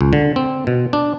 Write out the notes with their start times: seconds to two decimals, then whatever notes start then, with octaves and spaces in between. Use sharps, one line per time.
0.01 C#2
0.13 D3
0.36 C4
0.67 B2
0.93 D4